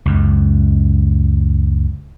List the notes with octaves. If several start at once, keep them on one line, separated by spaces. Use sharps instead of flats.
C#2 F#2